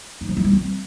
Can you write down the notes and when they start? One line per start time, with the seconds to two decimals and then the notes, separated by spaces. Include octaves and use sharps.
0.21 D#4
0.29 F3
0.37 E4
0.44 G3
0.52 C4